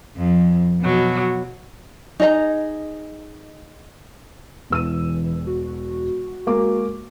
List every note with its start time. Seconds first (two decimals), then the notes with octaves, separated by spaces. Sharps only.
0.16 F2
0.81 B2 F#3
2.20 D#4 G#4 D#5 A#5
4.70 E1 E3 E6 D#7
5.47 F#4
6.47 G#3 A#3 D6